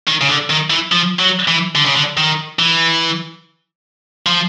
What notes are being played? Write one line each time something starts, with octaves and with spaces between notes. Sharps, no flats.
D#3
C#3
D3
D#3
E3
F3
F#3
E3
D3
C#3
D3
D#3
E3
F3